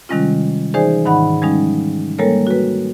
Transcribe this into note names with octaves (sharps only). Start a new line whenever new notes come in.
C3 D#3 G3 G#3 C#4 F4
E3 D#4 G#4 C5 D5 G#5
G#2 D#3 D#4 F#5 B5
F3 G3 G#3 C#4 D#4
G3 G#3 A#3 A4 A#4 C#5
F#4 B4